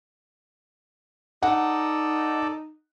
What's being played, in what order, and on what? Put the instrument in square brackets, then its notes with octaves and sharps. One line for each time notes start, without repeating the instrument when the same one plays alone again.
[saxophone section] D#4 [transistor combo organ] A4 D5 [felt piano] F#5